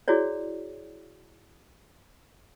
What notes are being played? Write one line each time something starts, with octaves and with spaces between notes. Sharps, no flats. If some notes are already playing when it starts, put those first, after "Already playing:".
E4 F#4 G#4 C#5 D5